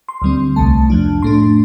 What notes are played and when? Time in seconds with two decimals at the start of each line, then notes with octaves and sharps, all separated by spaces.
0.09 C6
0.22 D2 D3 G3 C4
0.56 C2 C3 A3 A5
0.90 F2 F3 D4
1.22 A2 A3 D4 C6